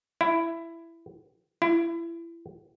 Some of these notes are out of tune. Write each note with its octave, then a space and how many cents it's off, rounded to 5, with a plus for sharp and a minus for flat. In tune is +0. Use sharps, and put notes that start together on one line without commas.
E4 +15
E4 +30